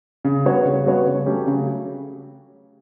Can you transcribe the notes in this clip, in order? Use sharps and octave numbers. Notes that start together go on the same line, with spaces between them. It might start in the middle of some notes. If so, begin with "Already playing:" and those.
C#3
G3 B3 F#4 C#5
C#3
G3 B3 F#4 C#5
C#3
F#3 A3 C#4 G4
C#3